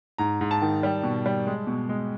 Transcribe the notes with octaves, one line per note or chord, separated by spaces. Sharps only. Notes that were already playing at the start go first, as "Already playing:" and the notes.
G#2 A#5
G#2
A5
D#3
G3
B2
G3
G#3
B2
G#3